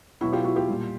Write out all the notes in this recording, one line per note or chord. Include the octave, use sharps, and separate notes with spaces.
B2 F#3 E4 F#4
F4 G4
E4 F#4
F4 G4
A#2 G3